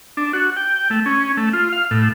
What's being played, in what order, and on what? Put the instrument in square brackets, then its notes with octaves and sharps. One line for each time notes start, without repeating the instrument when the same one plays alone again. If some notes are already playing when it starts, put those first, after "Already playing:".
[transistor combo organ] D4
F#4
G5
A3
C#4
A3
F4
F5
A2